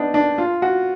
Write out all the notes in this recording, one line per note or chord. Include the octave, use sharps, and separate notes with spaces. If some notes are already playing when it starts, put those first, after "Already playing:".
Already playing: B3 D4 D#4
D4
F4
F#4